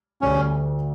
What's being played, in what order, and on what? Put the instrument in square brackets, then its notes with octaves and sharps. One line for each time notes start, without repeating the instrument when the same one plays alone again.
[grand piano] D2 D3 G3 [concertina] C#4